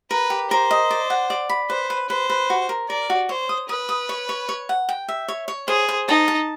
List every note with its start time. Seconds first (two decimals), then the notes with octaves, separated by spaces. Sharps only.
0.11 A#4 B4
0.30 G4
0.50 A#4 C5
0.71 D#5
0.91 D5
1.10 F#5
1.30 D5
1.50 B5
1.70 B4 C5
1.90 B4
2.09 B4 C5
2.30 B4
2.50 F#4
2.69 A#4
2.90 A#4 D5
3.10 F#4
3.29 C5 C#5
3.49 D#6
3.69 B4 D#6
3.89 D#6
4.09 C#5
4.29 C#5
4.49 C#5
4.69 F#5
4.89 G5
5.09 E5
5.28 C#5
5.48 C#5
5.68 G#4 C5
5.89 C5
6.08 D#4 A5
6.28 A5